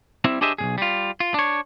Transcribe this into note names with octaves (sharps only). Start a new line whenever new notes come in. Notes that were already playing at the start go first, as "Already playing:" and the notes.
G3 C4 E4
D4 G4 G#4 C5 D#5 E5
B1 A#2 G#4
G3 F4
F4
D4 C#5